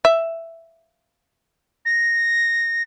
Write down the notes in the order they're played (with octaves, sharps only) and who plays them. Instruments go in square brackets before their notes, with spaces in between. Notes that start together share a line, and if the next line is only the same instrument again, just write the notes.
[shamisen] E5
[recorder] A#6